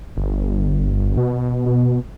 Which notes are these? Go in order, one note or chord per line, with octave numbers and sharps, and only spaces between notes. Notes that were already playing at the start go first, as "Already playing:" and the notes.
G1
B2
B2